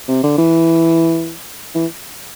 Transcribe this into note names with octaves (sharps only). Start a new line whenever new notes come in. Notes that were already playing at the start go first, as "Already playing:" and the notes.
C3
D3
E3
E3